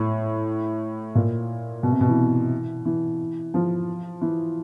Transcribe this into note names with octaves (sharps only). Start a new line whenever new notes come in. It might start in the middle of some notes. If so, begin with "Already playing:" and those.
Already playing: A2
A#2
B2
C3
B2
E3
E3
F3
E3